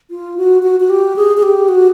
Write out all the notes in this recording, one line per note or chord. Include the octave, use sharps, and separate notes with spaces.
F4
F#4
F#4
F#4
G4
G#4
G#4
G4
F#4